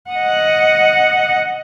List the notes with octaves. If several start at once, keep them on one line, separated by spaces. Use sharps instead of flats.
D#5 F#5